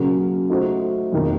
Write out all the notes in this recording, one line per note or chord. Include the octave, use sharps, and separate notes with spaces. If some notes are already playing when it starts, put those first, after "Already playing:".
Already playing: C#3 F#3 A#3 C#4
A3 D#4 F#4 C5
F2 D#3 A#3